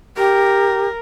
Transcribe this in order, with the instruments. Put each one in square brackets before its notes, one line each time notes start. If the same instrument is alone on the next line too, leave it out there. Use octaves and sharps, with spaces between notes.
[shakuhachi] G4 [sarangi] A#4